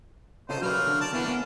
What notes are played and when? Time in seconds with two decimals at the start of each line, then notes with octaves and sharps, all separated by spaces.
0.49 C#3 D#4 F4 A4 C5
0.62 F#3 A3 A#3 B4 D5 F6
0.87 D3
1.01 D5 A5
1.13 A#3 B3 C#4 D4 E4 B4
1.28 B3